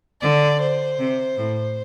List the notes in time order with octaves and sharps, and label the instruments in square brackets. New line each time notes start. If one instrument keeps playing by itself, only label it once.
[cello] D3 [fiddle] D5
[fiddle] C5
[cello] C3
A2